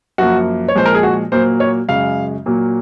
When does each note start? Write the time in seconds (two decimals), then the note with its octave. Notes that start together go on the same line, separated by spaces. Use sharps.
0.18 F#2 F3 A#3 F#4
0.68 C#5
0.75 A#2 F3 G#3 C5
0.86 A#4
0.95 G#4
1.03 F#4
1.32 A#2 F#3 A#3 C5
1.60 C#5
1.88 F#2 C#3 G#3 F5
2.46 A#2 F#3 A#3